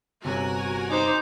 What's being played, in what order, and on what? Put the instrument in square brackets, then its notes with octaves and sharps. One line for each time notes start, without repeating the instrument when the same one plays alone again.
[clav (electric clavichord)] G1 C3 C#5 [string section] F#4 A#4 G#5
[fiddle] D#4 C5 [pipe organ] A#5 D6 G6